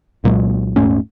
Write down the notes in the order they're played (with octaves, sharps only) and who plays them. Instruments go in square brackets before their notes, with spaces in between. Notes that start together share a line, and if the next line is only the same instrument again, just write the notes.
[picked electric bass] C2 A#2 F#3 G#3
D#1 G#2 A3 C#4